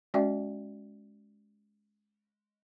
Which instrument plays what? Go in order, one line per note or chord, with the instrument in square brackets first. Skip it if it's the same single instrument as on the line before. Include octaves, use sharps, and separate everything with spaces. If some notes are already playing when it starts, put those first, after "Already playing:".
[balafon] G#3 C#4 F#4 D5 E5 G5